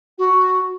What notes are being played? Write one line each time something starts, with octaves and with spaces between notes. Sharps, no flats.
F#4